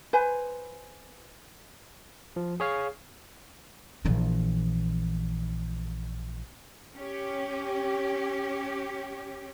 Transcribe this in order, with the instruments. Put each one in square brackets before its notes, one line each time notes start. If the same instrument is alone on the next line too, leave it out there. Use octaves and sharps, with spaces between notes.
[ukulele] B4 C5 G#5
[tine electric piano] F3
G#4 C#5 F5
[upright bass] A#1 E3
[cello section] C#4 G4